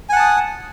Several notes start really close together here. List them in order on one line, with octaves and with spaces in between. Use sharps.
G#5 F#5 A5 D#6